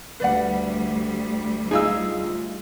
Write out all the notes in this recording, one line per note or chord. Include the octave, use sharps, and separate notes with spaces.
D2 G3 B4 D5 F#5
D#4 F4 G#4 E6